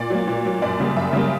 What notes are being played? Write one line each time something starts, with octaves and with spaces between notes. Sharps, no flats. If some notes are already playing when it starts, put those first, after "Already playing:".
Already playing: A#2 D5
F#3 A#3
A#2
F#3 A#3
F#2 D5
C#3 G3 A#3
F#2 E5
C#3 G3 A#3